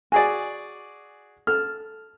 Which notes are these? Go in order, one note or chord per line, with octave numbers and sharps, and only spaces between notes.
F#4 G#4 D5 G#5
A4 F6